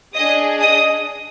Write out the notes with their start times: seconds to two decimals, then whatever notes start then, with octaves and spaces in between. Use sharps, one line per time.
0.15 D4 G#4 D#5 D#6
0.61 D#5 D#6